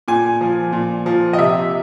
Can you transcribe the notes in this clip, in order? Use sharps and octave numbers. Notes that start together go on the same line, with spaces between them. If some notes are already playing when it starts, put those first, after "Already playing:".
A#2 G#5
F3
A#2
F3
D#5
C3 E5